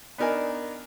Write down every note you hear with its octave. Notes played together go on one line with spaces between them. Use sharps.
B3 D4 D#4 A#4 D5 G#5